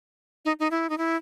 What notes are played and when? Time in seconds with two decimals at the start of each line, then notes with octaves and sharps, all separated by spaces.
0.45 D#4
0.60 D#4
0.71 E4
0.89 D#4
0.98 E4